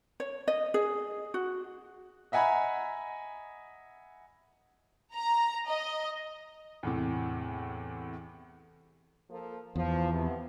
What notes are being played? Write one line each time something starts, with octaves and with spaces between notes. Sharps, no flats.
C#5
D#5
G#4
F#4
D#5 E5 F#5 G#5 A#5 B5
A#5
D#5
E2 A2 C3
F3 A#3 A4
E2 F3
C3 B3